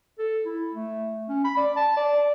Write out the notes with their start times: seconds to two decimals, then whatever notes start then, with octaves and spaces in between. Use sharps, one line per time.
0.19 A4
0.45 E4
0.74 A3
1.29 C#4
1.44 B5
1.57 D5
1.76 A5
1.97 D5